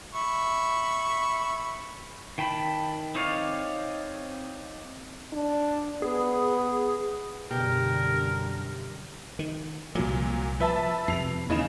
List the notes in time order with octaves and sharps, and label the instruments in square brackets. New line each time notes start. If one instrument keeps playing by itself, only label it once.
[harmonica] E5 B5 C#6
[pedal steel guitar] D#3 G5 A5 B5
C4 D#4 C#5 D5 F5
[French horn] D4
[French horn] B3 [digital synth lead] G#4
[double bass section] F#2 D3 G3 [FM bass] B2 [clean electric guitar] G4 [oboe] A#4
[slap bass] D#3
[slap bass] C2 F3 [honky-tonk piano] A#2 F#3
[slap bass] F3 [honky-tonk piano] B4 E5 A5
[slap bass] F2 C3 [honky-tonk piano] C7 F7
[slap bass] D#2 A#2 E3 [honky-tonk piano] C#3 D#4 E7